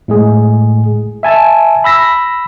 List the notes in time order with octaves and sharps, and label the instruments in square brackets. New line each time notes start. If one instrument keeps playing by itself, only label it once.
[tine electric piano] A2 G#3 G#4
E5 G#5 A5
B5 E6 A#6 B6